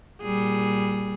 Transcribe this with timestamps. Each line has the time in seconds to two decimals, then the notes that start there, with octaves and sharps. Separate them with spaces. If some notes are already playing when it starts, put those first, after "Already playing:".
0.22 A#2 G3 G#4